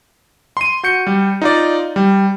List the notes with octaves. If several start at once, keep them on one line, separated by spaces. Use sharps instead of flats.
C6 D#7
F#4 G6 C#7
G3
D#4 F4 D5
G3